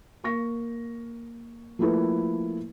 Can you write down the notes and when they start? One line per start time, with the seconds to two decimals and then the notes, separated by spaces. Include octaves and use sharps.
0.24 A#3 C#6 A#6
1.79 F3 A3 A#3 E4 A4 B4